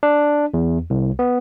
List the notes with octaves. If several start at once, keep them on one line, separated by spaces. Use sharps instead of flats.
D4
E2
C2
B3